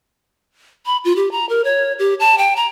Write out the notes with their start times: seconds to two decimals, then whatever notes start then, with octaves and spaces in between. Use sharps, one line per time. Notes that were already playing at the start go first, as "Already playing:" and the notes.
0.86 B5
1.05 F4
1.16 G4
1.31 A#5
1.49 A#4
1.64 C#5
1.99 G4
2.20 A5
2.38 G5
2.56 A#5